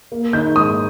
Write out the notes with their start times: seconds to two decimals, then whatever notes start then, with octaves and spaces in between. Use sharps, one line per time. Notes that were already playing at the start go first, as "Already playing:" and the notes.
0.12 A#3
0.33 D#3 G6
0.56 G#2 D#6